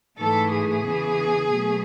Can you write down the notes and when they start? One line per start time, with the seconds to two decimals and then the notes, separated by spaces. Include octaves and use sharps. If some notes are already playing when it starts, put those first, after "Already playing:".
0.18 G#2 E3 A3 A4
0.51 G#4
0.84 E2 C#3 E3
1.51 B2 F#3 A3